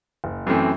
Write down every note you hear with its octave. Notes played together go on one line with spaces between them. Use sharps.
F#1
F#2 E3 A3 C4